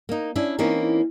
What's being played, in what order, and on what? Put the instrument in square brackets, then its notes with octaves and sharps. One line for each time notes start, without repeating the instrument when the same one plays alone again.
[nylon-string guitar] A#3 D#4
C#4 D4 E4
E3 A#3 C4 C#4 D#4